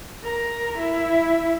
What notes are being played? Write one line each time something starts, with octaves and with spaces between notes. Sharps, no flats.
A#4
E4